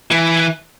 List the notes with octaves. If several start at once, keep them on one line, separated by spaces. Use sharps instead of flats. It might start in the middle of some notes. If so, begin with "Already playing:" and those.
E3